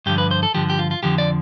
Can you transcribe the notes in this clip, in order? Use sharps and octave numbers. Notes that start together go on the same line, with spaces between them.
G2 D3 F3 G4
B4
C5
A4
G2 D3 F3 G4
G4
F4
F4
F2 D3 F3 G4
D5